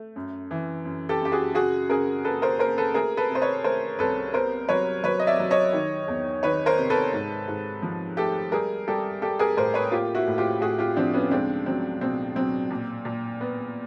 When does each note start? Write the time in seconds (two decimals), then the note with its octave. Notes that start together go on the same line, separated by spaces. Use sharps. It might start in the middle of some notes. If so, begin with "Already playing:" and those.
Already playing: A3
0.16 F#2
0.51 E3
0.85 F#2
1.09 G4 A4
1.21 F#2 G4
1.32 F#4 G#4
1.55 C#3 F#4 G#4
1.89 C#3 G#4 A#4
2.24 A#3 A4 B4
2.42 A#4 C5
2.59 A#3 A#4 C5
2.78 A4 B4
2.94 A3 G#4 A#4
3.17 A4 B4
3.30 C3
3.35 C5
3.41 B4 C#5
3.64 A3 A#4 C5
3.99 C2 A4 B4
4.34 B3 A#4 C5
4.68 F#3 B4 C#5
5.03 F#3 B4 C#5
5.19 D#5
5.27 D5 E5
5.39 F#3
5.51 C#5 D#5
5.73 D#3
6.08 E2
6.43 D#3 B4 C#5
6.66 A#4 C5
6.78 C3
6.90 A4 B4
7.13 G#2
7.48 G#2
7.82 F3
8.17 A3 G4 A4
8.52 G3 G#4 A#4
8.88 G3 G4 A4
9.22 G3 G4 A4
9.39 G#4 A#4
9.57 A2 A#4 C5
9.74 B4 C#5
9.91 A#3 F4 G4
10.15 E4 F#4
10.27 A2
10.38 F4 G4
10.61 A2 F#4 G#4
10.79 F4 G4
10.96 F3 C4 D4
11.14 B3 C#4
11.31 C#2 C4 D4
11.66 F#3 C4
12.01 B2 C4
12.36 F#3 C4
12.71 A#2
13.05 A#2
13.41 B3